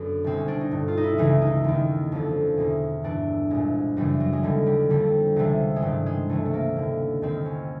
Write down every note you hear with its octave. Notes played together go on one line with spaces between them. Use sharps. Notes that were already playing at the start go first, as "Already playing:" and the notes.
Already playing: F#2 D3 B3
C2 B2 C4
C#4
D4
D#4
G2 D3
F4
D#4
E4
C#2 C#3 E3 D#4
D#4
D#2 D#3
F2 D3
E2 B2
G2 E3 D4
C2 A#2 G#3
F#2 C#3 E3 G3
F#3
G#3
D#2 D3 G3
G3
F2 D3 G3
C#2 C3 E3
G#3
G2 D#3 G3
G#3
C#2 C3 E3 A3
A3
A#3
D#2 D3
D#2 D#3 C4
C#4